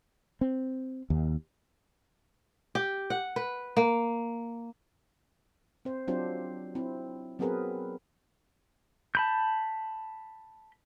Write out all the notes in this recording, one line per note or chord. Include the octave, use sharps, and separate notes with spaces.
C4
D#2
G4
F#5
B4
A#3
C4 C5
F#3 C4 D4 F4 G4 C5
C4 E4
F#3 B3 C4 G#4 A#4 B4
A5 B5 G6